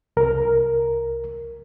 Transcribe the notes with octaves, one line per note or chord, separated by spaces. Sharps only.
C2 A#4